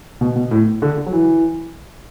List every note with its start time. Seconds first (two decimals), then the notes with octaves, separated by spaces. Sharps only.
0.21 B2
0.36 B2
0.51 A2
0.82 D3
0.97 D3
1.06 F#3
1.13 E3